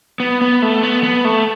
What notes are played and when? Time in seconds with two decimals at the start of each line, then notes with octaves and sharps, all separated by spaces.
0.20 B3
0.41 B3
0.62 A3
0.83 B3
1.03 B3
1.25 A3